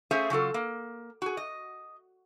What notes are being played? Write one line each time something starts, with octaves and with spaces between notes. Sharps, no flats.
A3 C#4 G#4 C5 E5 F5
C#3 F#3 F4 A4
A#3
F#4 G#4
D#5